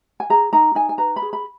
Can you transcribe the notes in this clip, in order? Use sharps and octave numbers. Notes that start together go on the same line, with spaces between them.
G#5
G#4 A#5
D#4 A#5
D#4 G#5
G#5
B4 A#5
B5
G#4
B5